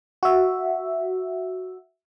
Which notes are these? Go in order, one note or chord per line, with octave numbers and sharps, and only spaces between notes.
F#4 E5